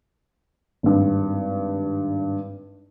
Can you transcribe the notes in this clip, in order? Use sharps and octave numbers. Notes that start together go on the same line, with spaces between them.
G#1 G2